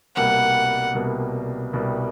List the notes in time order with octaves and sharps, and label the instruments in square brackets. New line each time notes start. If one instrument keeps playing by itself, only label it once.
[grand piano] C2 B2 G3 A#3 [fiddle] F#5
[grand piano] C2 B2 G3 A#3
C2 B2 G3 A#3